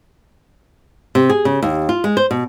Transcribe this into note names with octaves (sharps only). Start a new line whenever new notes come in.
C3
G#4
C#3
D#2
F4
G#3
C5
B2